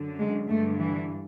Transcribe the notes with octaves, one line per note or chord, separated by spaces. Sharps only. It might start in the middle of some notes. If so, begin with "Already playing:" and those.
Already playing: F#2 D3
G#3
G2 D3 A3
E3